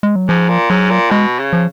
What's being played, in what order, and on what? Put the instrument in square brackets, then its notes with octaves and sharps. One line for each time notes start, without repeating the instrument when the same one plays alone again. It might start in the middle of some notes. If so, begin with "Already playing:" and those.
[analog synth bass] G#3
F#3
[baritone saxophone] G#2 [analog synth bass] F3
[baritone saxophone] A#2
[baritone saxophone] G#2 [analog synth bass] F#3
[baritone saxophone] A#2
[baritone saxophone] B2 [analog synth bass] G#3
[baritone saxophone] C#3
[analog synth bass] F3